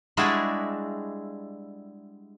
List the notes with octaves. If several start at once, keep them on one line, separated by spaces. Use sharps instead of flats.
G3 G#3 D4 E4 F#4 G#4